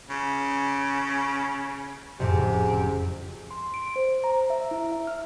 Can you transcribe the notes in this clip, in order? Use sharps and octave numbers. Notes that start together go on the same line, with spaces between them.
C#3
F#1 F2 A2 C3
C6
D7
C5
A#5
E5
E4
E5
F6